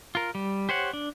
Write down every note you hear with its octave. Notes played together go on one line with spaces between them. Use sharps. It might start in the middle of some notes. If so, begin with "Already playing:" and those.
F4 A#4
G3
G4 C5 C#5 F#5
D4